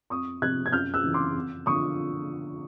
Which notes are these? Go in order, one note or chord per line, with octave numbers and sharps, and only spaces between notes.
F2 C#6 D#6
C3 F3 F#6 G#6
G#6
F#2 F6 G6
E6 F#6
C#3 E3
C6 D6
F2
D3 F3 C#6 D#6